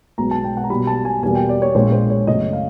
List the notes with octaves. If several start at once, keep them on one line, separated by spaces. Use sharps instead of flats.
B1 B2 G#3 B3 A#5
A5
G5
F#5
A#5
B1 B2 G3 B5
A5
G#5
E2 B2 G3 A#3 G#5
G5
D5
C#5
A#1 A#2 F3 G#3 C5
C5
C#5
F#2 C#3 F#3 A3 D#5
F5